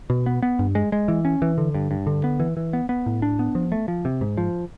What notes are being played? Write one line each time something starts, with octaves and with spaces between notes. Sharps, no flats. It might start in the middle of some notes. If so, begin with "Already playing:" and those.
B2
B3
B3
G2
G#3
G#3
E3
C#4
E3
D3
G2
G2
D3
B3
E3
E3
B3
B3
A2
D4
B3
F3
A3
F3
C3
G#2
F3